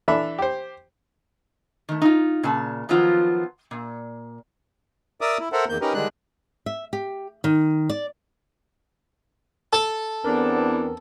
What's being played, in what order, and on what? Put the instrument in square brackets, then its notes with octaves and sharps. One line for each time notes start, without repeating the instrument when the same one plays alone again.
[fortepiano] E3 D4 A4 E5 B5
G4 C5
[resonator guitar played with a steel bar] D#3 A3
D#4 F4
A#2 C#3 A5
D#3 F3 F#3 B3 F4
A#2
[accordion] A#4 D5 E5 D6 D#6
E4
A4 A#4 C5 E5 F#5
E2 D#3 A#3 G6
C#4 D#4 G4 A#4 B4
D3 D#3 G3 G#3 D4 F#6
[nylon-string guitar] E5
G4
D#3
D5
[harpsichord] A4 A5
[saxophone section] E2 D4 [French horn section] B3 C4 [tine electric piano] A#4